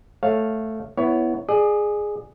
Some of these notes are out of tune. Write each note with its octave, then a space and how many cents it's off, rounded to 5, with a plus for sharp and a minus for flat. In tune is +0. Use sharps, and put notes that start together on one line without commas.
A3 +0 C#5 -15 F5 +0
B3 +0 E4 +0 C#5 +10
G#4 +0 D5 +35